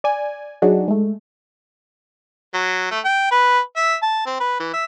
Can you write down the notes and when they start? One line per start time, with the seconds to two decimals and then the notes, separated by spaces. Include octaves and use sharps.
0.04 D5 G#5
0.62 F#3 D4 D#4 F#4 G#4
0.88 G#3 A3
2.54 F#3
2.91 A3
3.05 G5
3.32 B4
3.76 E5
4.02 A5
4.26 C4
4.40 B4
4.60 E3
4.74 E5